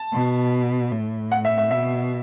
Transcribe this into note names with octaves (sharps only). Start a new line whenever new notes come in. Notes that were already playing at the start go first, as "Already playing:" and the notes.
Already playing: A5
B2
A2
F#5
E5
E5
B2 E5